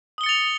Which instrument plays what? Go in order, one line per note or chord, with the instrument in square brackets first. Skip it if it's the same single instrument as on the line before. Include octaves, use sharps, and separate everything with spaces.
[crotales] D#6
G7
C#7
A6
F7